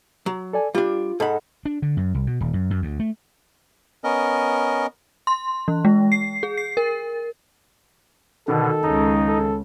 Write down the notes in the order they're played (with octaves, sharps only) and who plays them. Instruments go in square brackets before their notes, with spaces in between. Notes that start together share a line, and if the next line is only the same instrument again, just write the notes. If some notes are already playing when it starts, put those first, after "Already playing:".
[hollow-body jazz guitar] F#3
[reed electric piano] A4 D5 G#5
[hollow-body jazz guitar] G3 D4 [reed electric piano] F4
[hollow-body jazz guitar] G#2 B5 [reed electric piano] A4 D#5 F#5
[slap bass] D4
D3
F#2
C2
B2
D#1
F#2
F#2
D2
A3
[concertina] B3 C#4 A#4 D#5
[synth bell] C6
E3
G#3
C7
G#4
C7
A#4
[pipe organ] B2 D3 [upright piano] D#3 [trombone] A4
[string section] C#2 C#3 [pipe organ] D#4
[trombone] A4